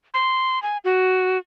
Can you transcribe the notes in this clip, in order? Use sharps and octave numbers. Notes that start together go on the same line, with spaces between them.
C6
G#5
F#4